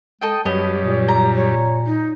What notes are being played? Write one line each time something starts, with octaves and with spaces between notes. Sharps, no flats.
G#3 A4 D#5 G5
F#2 G3 B3 F#4 C#5 D#5
A#2
A#5
C#5
D#4